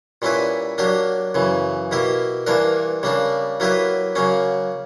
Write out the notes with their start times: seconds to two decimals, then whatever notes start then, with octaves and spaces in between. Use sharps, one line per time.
0.22 A#2 G3 C#4 E4 B4
0.78 F#3 A#3 D4 G4
1.35 F#2 C#3 E3
1.91 B2 A#3 E4 G4
2.47 G2 E3 A#3 D4 A#4
3.03 C#3 G3 A#3 D4
3.60 F#3 A#3 E4 G4 B4
4.15 C#3 F#3 A#3 C#4